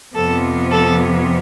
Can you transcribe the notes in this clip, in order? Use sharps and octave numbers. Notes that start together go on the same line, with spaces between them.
F2 C3 F3 B3 A4
A4